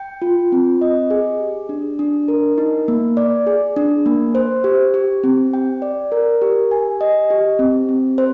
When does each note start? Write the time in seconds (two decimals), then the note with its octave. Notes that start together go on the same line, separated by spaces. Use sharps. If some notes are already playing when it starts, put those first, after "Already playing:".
Already playing: G5
0.22 F4
0.52 C4
0.81 D#5
1.10 G#4
1.40 G4
1.69 D4
1.99 D4
2.28 A#4
2.58 D#4
2.88 A#3
3.17 D5
3.47 G#4
3.76 D4
4.06 A#3
4.35 C5
4.64 G4
4.94 G4
5.23 C4
5.53 G5
5.82 D5
6.12 A#4
6.42 G4
6.71 G#5
7.01 D#5
7.30 G4
7.59 C4
7.89 C4
8.18 C5